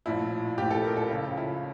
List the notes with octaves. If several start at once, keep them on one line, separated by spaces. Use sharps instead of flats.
A#1 A2 F3 E4
A#1 A2 F3 G4
A4
A#4
A4
C#2 C#3 F3
E4